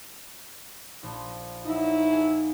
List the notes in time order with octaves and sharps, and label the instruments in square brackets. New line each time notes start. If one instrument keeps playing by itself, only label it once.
[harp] A#1
[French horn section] F#3 E4 [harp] D#4
[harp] G#4